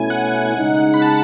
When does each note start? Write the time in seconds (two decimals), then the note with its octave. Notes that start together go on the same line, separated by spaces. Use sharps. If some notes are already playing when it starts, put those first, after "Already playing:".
Already playing: B2 A3 C#4 E4 G#5
0.10 F#5
0.56 C#3 G#3 D#4
0.94 B5
1.02 A5